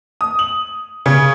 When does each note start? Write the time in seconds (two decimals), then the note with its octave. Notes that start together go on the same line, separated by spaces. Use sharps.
0.21 D#6
0.39 F#7
1.06 C#3